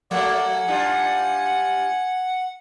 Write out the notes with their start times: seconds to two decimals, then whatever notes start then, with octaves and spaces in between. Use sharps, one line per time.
0.11 F#3 A3 A#3 D5 F#5
0.55 G#5
0.67 G3 D4 F4